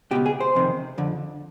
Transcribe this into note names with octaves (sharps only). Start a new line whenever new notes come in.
C#2 B2 G4
G#4
C5
F2 C3 D#3
F2 D3